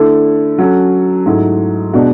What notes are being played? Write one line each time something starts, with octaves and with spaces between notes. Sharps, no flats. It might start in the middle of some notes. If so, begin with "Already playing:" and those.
Already playing: D3 A3 E4 A4
F#3 C#4 F#4 A4
G#2 F#3 A3 E4
B2 G#3 D4 F#4